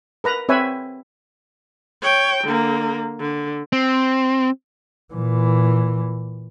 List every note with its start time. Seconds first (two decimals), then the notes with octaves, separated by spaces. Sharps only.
0.24 A#4 B4 A#5
0.49 C4 B4 C#5 E5 G#5
2.02 C#5 G5
2.44 D3 A#3
3.20 D3
3.73 C4
5.14 A#2 E3